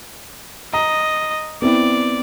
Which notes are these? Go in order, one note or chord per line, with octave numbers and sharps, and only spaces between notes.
D#5 A#5
B3 C4 E4 D5